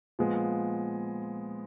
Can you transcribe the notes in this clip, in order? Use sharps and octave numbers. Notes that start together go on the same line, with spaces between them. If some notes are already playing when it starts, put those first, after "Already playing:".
A#2 F3 G#3 B3